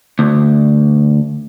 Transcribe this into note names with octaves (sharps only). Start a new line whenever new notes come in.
D2